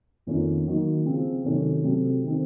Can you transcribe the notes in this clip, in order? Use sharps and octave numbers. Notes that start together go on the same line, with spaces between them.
F2 D#3 A#3 C#4 F4
D#3 F#3 A#3
C#3 F3 C4 F4
C3 D#3 F#3 A3 C#4
C3 F#3 A3 C4
D#3 A3 C4